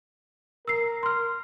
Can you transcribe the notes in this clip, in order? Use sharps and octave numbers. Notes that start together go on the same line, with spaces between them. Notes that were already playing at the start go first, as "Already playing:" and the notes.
A#4 E6 C7
C6 F6